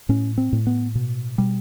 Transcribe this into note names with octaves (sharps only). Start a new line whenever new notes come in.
A2 C#4
C4
A2
B3
B2
B2 G3